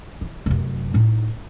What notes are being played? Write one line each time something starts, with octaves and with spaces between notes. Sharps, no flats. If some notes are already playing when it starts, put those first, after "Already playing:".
E3
F1 F#2
A2 D#4